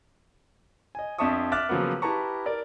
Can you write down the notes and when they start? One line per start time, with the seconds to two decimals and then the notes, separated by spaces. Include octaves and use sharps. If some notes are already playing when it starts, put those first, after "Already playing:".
0.95 D#5 G#5
1.18 F2 D4 E5 A5 C#6 D#6
1.52 E5 D6 F6 F#6 A6
1.69 C#3 F3 F#3 A#3 B3
2.02 E4 G4 B4 A5 A#5 C#6
2.46 A#4 D5